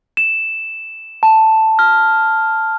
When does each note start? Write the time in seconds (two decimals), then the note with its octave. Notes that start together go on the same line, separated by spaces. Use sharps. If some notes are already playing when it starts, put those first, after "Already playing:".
0.17 E7
1.23 A5
1.79 F6